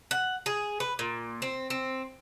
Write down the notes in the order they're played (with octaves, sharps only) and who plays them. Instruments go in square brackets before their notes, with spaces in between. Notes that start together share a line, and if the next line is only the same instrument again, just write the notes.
[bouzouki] F#5
G#4
B4
A#2
C4
C4